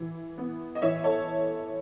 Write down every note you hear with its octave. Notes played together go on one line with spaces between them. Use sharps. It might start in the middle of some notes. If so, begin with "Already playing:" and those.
Already playing: E3 E4
B3
D#5
E3 C#5 E5
A4 C#5